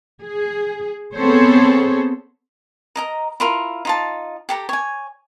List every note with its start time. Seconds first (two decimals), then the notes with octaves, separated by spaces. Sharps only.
0.23 G#4
1.15 B3 C4 G#4 A4 C5 C#5
2.96 A#4 D#5 A#5
3.40 E4 F4 A#4
3.85 D#4 F4 A5
4.49 G4 A4 A#5
4.69 C#5 G#5